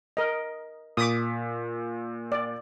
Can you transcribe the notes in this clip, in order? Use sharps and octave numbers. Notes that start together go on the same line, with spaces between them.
A#4 D#5
A#2 D6 D#6 B6
D5